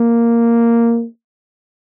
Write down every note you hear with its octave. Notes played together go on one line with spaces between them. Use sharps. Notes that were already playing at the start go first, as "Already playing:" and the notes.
Already playing: A#3